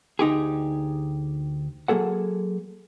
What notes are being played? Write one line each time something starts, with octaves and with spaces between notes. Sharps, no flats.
D2 D#4 G4 G#4
F#3 A#3 G#4 A4 F#5